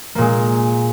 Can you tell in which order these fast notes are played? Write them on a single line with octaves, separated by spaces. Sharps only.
A#3 A#2 G#3